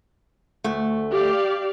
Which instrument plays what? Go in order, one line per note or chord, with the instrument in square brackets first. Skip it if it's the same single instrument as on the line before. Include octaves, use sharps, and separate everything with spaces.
[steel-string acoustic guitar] D2 A3
[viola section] G4 D5 F5